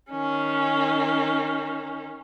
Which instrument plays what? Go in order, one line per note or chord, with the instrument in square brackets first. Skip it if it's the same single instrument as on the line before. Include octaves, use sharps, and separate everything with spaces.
[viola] D#3 C#4